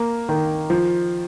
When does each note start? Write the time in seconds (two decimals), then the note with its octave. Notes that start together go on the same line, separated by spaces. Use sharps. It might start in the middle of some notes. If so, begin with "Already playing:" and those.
Already playing: A#3
0.29 D#3
0.70 F3